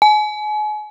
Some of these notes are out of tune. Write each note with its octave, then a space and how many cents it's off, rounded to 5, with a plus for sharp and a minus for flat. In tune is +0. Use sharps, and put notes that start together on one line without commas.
G#5 +35